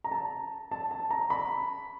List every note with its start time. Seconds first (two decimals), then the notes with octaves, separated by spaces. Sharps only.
0.04 A#5
0.11 A5
0.71 A5
0.91 A5
1.11 A#5
1.30 B5